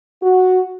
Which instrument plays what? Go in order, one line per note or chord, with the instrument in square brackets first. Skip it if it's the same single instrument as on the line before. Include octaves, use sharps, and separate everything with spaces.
[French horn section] F#4